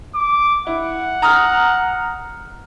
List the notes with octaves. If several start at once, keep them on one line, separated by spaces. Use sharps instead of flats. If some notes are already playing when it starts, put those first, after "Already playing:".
D6
E4 F#5
A#5 D#6 F6